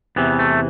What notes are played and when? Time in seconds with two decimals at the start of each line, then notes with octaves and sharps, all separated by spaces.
0.16 E2 C3 E3 B3
0.39 A3